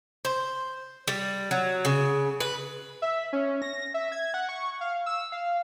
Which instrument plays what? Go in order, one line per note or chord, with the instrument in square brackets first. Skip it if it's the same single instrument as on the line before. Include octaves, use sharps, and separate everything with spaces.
[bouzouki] C5
G3
F#3
C#3
B4
[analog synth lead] E5
C#4
A#6
E5
G#6
F#5
C#6
F5
E6
F5